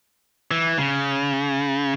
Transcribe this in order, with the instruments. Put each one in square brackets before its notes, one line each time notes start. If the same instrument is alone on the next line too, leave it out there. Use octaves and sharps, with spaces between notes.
[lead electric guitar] E3
C#3